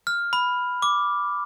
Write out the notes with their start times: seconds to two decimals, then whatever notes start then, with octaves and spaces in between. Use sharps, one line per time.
0.07 F6
0.33 B5
0.82 D6